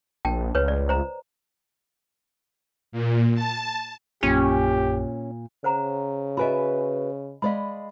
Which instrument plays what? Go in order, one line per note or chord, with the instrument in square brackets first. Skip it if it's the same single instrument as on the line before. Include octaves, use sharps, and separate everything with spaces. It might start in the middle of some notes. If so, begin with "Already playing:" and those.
[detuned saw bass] A#1 [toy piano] G5 A5
[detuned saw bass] C#2 [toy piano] B4 C#5
[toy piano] D5
C5 A#5
[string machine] A#2
A5
[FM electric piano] A#1 F#2 [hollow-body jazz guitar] A#2 [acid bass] C#4 [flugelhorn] G4
[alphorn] C#3 [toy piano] C5 F#5 A#5
[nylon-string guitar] F#4 B4 E5 [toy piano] D#5 G#5 B5
[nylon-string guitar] G#3 D5 D#5 [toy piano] F5 B5